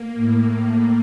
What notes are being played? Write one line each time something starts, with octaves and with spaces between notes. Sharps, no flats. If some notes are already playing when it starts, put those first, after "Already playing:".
Already playing: A#3
A2